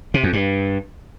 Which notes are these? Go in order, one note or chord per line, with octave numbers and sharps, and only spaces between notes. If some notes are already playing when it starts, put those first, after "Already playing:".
C3
F2
G2